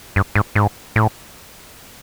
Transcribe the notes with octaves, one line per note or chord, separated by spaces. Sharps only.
G2
G#2
G#2
A2